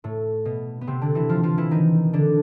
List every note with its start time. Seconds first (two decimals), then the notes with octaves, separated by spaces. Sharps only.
0.04 A2 A3
0.45 B2 B3
0.81 B3
0.87 C3 C4
1.01 D3 D4
1.15 E3 E4
1.29 F3 F4
1.43 F3 F4
1.58 E3 E4
1.71 D#3 D#4
2.13 D3 D4